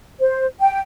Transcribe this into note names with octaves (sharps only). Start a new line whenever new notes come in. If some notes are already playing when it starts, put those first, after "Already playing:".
C5
G5